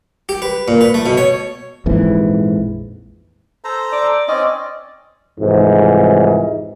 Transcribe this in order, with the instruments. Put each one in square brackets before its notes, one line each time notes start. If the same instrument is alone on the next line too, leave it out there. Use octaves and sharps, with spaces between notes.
[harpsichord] G4
B4
A#2
B4
A3
B2
C#5
[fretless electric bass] A#1 F2 G#2 E3
[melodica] A4 C5 A#5
[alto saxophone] D5
[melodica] C4 C#4 D5 [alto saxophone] D#5
[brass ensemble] C2 F2 G#2 E3